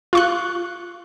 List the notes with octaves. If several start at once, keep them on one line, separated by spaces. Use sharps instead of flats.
F4 C#6 F#6